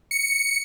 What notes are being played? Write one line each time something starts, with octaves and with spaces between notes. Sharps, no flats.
C#7